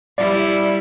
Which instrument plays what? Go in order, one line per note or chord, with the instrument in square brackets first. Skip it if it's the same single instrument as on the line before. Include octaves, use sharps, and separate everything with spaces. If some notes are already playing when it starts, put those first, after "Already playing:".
[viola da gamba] G3 E4 [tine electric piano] D5